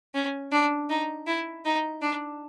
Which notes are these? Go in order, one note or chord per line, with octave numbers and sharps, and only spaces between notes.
C#4
D4
D#4
E4
D#4
D4